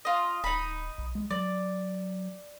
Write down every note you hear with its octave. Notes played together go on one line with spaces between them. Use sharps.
F4 D#5
D1 D#4 B5
B1
G#3
F#3 D5